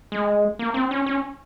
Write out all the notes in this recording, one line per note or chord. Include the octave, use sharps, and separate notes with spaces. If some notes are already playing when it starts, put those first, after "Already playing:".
G#3
A#3
C4
C#4
C#4